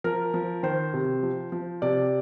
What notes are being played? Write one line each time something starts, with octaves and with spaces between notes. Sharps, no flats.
F3 A#4
F3
D#3 C5
C3
F3
F3
C3 D5